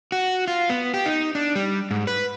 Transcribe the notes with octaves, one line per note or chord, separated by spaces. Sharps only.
F#4
F4
B3
G4
D#4
D4
G3
G#2
B4